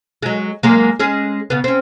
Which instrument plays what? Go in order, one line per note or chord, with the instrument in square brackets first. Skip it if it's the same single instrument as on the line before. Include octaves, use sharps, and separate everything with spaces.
[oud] F#3 G#3
F#3 G#3 A#3
G#3 C#4 G#4
C#3 B3
C4 C#4